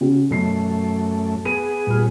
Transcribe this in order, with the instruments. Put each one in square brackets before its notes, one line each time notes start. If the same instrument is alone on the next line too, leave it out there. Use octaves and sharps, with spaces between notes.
[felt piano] C#3 F#4
[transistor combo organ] F#2 A3 [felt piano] B2 F#3 C7
[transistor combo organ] B3 G#4 [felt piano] D#7
[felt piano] D#1 F6